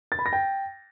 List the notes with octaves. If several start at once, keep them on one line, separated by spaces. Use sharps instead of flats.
A6
B5
A#6
G5